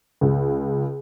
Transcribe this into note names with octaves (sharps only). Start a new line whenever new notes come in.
C#2